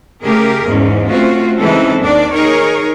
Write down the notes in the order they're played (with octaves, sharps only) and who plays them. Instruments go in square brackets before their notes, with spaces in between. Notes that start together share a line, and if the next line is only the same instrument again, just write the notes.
[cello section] C#3 A3 G4 G#4 A#4
E2 G#2 C#4
A3 C4 C#4 F4 F#4
C#3 E3 G#3 C4 D#4 A4
D#2 D#3 D4 D5
D#4 G#4 A#4 C#5